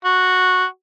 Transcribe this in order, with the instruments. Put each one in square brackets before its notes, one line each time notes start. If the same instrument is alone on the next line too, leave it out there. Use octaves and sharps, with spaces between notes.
[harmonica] F#4